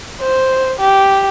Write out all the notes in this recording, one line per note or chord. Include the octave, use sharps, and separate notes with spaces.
C5
G4